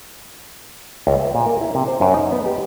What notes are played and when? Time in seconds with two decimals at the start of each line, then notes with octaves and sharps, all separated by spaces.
1.07 C#2
1.20 E5
1.35 A#2
1.46 A#4
1.61 E4
1.75 C3
1.88 C5
2.01 F#2
2.14 D#4
2.32 B3
2.46 G4